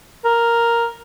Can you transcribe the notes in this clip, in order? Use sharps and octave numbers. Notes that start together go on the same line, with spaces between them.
A#4